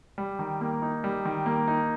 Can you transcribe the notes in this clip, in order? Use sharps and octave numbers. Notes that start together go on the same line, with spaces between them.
G3
D#3
A#3
D#4
G3
D#3
A#3
D#4